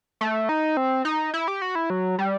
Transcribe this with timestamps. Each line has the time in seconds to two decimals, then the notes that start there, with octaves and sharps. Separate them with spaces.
0.21 A3
0.49 D#4
0.77 C4
1.05 D#4
1.34 E4
1.48 G4
1.62 F#4
1.75 E4
1.90 F#3
2.19 G3